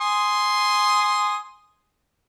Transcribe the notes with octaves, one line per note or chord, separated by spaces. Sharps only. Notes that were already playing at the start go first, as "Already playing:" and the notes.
G#5 C6 D#6